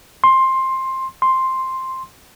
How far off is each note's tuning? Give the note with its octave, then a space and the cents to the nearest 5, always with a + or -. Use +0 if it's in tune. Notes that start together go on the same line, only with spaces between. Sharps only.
C6 +15
C6 +5